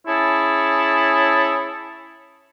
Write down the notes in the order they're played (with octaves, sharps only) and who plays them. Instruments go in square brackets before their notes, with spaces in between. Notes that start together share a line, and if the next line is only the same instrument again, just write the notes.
[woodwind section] C#4 E4 G#4 C#5 A5